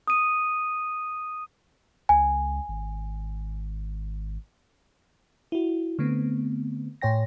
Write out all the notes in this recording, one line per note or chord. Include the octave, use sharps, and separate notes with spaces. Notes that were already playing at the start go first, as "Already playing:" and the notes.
D#6 D#7
C#2 G#5
G#1
E4 F#4
D3 A3 B3 C4
A2 C#5 G5 A#6